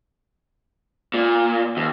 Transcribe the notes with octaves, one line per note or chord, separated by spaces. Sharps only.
A#2
D#2